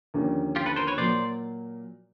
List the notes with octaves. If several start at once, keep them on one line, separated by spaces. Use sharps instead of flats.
D#2 D3 F3 A#3 C#4
F4 G4
A4 B4
A#4 C5
B4 C#5
A#2 F#3 A#3 C5 D5